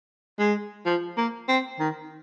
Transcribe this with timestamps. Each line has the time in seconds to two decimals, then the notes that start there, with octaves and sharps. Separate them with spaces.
0.39 G#3
0.86 F3
1.17 A#3
1.49 C4
1.80 D#3